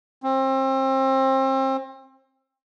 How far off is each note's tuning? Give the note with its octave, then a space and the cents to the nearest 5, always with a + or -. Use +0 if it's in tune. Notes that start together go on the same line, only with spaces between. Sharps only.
C4 +30